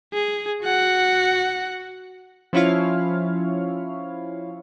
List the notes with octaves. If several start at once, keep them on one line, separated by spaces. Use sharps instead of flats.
G#4
F#4 F#5
F3 C#4 E4 F4 C#5 F5